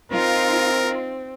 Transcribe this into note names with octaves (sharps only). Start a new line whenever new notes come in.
C4 D#4 F4 A#4